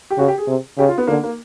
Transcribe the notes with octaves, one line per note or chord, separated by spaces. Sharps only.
G4
C#3 F#4
G4
G#4
C3
C#3 G4
F4
B3
D3 A#3
A#3